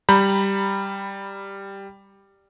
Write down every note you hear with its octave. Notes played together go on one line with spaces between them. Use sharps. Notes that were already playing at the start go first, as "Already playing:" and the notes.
G3 A#5 B5 G6